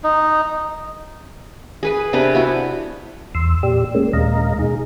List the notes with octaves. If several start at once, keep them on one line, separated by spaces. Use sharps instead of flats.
D#4
G#4 B4 G#5
C3 D4 B4 D6
B3 E4 F#4
E2 C6 E6
A#2 G4 D5 E6
G#3 A#3 C#4
D#2 A#2 G#3 D#5 F5 A#5
B2 D#4 G#4